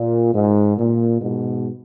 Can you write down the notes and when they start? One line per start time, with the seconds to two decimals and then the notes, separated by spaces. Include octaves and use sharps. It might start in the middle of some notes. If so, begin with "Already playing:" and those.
Already playing: A#2
0.33 G#2
0.78 A#2
1.21 G#2 B2